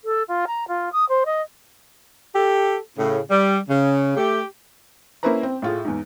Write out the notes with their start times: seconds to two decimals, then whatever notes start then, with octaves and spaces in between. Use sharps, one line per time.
0.04 A4
0.28 F4
0.47 A#5
0.68 F4
0.92 D#6
1.08 C5
1.25 D#5
2.35 G4 A4
2.98 A2 C#3
3.30 G3
3.69 C#3
4.17 A3 G4
5.23 A#3 C#4 E4 B4 C5 A#5
5.43 C4
5.62 A2 F4 G#4
5.85 E2 G#2